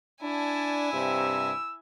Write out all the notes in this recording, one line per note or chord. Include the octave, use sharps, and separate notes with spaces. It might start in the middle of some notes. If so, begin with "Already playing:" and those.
D4 E4 G#5 A5
G2 C3 E6